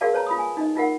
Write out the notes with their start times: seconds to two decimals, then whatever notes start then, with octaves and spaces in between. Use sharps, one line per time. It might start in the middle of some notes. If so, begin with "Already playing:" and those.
0.01 F#4 G#4 A#4 D5 F5 A5
0.13 B4 C#5 A5 A#5
0.26 F4 B5 D#6
0.38 G#5
0.57 D#4 D#5
0.76 D#4 F4 A#4 F#5